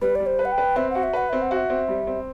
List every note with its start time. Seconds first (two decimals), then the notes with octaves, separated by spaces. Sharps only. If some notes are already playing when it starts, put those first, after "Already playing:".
0.01 G3 B4
0.15 G3 D5
0.26 C5
0.39 B4
0.45 F#5
0.52 G5
0.58 B4
0.76 C4 E5
0.90 F#4 F#5
1.03 E5
1.13 B4 F#5
1.30 C4 E5
1.42 F#5
1.51 F#4
1.56 E5
1.70 C4
1.88 G3
2.07 C4